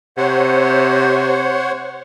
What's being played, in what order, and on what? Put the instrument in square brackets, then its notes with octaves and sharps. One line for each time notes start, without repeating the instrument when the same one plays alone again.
[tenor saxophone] C3 [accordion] C5 C#5 F#5